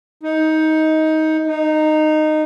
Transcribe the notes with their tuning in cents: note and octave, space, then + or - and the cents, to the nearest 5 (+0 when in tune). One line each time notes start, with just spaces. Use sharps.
D#4 +15
D#4 -15